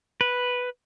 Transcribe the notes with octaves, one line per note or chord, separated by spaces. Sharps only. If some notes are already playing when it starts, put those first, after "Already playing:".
B4